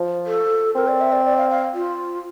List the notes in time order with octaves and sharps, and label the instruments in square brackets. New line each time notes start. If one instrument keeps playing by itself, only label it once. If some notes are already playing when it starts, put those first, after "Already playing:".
Already playing: [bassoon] F3
[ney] A4
[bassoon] C4 [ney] A#4
[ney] D5
E5
D5
D5
F5
F5
F4